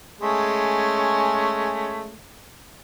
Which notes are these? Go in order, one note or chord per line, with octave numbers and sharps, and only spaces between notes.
G#3 A3 C#4